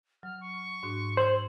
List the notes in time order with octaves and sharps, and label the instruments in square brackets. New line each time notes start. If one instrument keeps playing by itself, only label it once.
[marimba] F#3 [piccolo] F6
[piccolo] C#6
[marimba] G#2 D4 F#4
[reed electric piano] C5 [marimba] E6 G#6 [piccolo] F#7